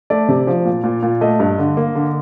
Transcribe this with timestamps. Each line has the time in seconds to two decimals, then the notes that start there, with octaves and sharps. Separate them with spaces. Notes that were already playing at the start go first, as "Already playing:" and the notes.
0.10 A3 D5
0.29 C3
0.47 F3
0.65 A#2
0.84 A#2
1.03 A#2
1.21 A3 D#5
1.40 G2
1.59 D3
1.77 A#3
1.95 D3